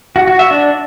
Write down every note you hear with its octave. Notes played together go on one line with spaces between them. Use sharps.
F#4
F#4
E5
D4